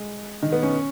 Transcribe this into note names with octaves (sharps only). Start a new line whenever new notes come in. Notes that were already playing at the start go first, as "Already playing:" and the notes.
Already playing: G#3
D#3
B3
C#4